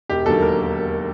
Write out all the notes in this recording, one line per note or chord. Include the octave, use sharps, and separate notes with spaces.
E1 G4
D#2 D3 F#3 A#3 A4
A#4